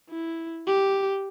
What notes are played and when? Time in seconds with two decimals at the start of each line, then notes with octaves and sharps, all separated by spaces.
0.10 E4
0.67 G4